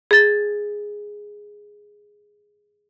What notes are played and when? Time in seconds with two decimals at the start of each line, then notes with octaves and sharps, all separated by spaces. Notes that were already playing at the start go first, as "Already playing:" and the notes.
0.11 G#4 A6